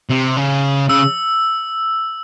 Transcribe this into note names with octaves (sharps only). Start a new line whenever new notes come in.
C3
C#3
C#3 E6